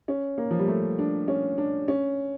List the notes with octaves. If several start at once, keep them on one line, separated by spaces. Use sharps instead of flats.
C#4
A#3
F3
G3
A3
D4
C#4
D4
C#4